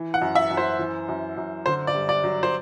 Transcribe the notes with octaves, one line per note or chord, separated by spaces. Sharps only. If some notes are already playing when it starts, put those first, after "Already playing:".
Already playing: E3
F#5
F#2
E5
F#2
C5
E3
F#2
F#2
D3 C5
D5
G2
D5
F#3
C5